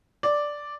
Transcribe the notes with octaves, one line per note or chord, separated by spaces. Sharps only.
D5